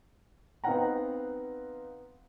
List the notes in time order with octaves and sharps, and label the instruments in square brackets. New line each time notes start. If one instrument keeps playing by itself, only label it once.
[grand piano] B3 C4 D#4 F5 F#5 A#5